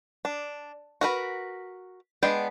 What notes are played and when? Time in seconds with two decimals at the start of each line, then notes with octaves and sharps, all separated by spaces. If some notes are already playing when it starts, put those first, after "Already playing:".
0.25 D4
1.01 F#4 A#4 B4
2.23 G#3 B3 D4 G5